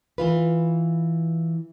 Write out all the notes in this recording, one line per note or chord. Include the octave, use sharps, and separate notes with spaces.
E3 F4 B4